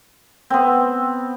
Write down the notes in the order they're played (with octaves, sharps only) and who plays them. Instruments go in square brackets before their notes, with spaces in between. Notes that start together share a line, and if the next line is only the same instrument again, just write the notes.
[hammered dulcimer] B3 C4